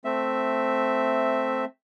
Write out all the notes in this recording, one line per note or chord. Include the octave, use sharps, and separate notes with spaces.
A3 C4 E5